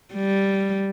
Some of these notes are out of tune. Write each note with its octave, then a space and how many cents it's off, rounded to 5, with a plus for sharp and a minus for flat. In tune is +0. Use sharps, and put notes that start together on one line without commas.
G3 -5